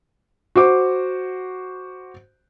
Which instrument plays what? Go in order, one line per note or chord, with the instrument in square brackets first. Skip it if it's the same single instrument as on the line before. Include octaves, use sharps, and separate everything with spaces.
[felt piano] F#4 C5 D6